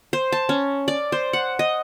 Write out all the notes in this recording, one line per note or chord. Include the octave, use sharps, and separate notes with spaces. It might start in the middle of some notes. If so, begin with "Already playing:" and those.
C5
A5
C#4
D5
C5
F#5
D#5